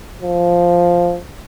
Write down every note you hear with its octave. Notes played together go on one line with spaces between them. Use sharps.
F3